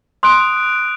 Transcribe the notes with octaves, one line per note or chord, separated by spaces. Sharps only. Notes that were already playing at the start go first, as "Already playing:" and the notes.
C6 D#6 F#6 D7